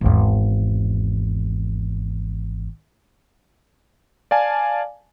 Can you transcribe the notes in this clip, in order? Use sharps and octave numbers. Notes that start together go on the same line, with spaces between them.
G#1 E2
D5 F5 G#5 A5